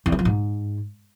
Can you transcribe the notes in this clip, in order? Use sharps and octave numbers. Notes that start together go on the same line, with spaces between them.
E2
E3
F3
G#2